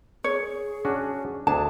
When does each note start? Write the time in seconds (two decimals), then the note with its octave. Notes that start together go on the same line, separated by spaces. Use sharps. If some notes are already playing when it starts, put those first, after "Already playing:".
0.24 G#4 C#5
0.85 C#4 D4 F#4
1.47 D2 D4 G#4 A5